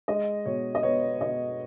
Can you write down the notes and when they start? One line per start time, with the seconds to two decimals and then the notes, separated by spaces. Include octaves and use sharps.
0.08 G#3 D#5
0.46 B2 C#5
0.75 D#5
0.83 B3 C#5
1.21 B2 D#5